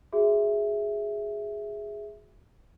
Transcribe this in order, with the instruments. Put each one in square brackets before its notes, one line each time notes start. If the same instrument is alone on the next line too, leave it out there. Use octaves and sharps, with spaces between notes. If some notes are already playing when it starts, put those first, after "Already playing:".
[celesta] F#4 G#4 E5